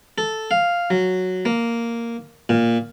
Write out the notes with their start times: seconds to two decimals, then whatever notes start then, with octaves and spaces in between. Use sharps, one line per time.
0.18 A4
0.51 F5
0.90 F#3
1.45 A#3
2.49 A#2